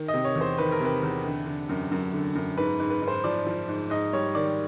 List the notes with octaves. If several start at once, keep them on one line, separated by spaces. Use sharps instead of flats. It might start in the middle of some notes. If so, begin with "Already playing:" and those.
Already playing: D#3
D#5
C3
C#5
E2
C5
D#3 B4
A#4
C3
B4
E2
D3
D3
F#2
F#2
D3
F#2
G#2 B4
G#2
B4
G#2
C5
F3 D5
F3
G#2
G#2 D#5
G3 C#5
D#3 D5